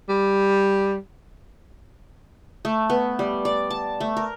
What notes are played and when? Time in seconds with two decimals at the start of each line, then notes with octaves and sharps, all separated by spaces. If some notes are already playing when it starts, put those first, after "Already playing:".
0.09 G3
2.65 A3
2.90 B3
3.19 G3
3.45 D5
3.70 A5
4.00 A3
4.17 A#4